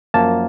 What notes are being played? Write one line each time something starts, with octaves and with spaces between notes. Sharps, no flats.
F#2 F3 A#3 A5